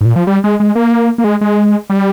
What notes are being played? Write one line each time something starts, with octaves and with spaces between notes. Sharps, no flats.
G#2
A#2
F3
G3
G#3
G#3
A#3
A#3
G#3
G#3
G3